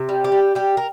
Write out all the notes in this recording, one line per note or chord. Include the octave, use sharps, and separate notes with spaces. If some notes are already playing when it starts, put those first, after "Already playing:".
Already playing: C3
G3
G4
G3
G3 G4
A#4